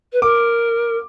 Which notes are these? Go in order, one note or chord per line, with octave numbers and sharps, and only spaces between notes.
B4
A#4 D6